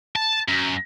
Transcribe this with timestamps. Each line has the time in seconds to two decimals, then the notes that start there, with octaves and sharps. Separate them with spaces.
0.15 A5
0.48 F#2